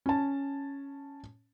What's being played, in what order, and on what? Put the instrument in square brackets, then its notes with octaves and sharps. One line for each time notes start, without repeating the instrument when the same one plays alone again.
[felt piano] C#4 A5